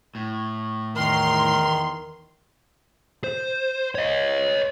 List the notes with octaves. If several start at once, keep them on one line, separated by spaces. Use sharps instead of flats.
A2
E2 D#3 A#4 C6
C5
C#5 D#5